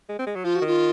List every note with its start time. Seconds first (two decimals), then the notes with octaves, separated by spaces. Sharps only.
0.09 G#3
0.19 C4
0.27 G#3
0.36 F#3
0.44 F3 F4
0.56 F#4
0.62 D#3
0.67 F4